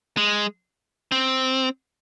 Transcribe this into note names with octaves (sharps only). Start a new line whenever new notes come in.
G#3
C4